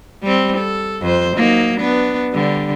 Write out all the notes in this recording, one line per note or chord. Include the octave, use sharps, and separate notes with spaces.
G3 C4
A4
F2 C5
F#3 A#3 D#4
B3 D4
D3 G3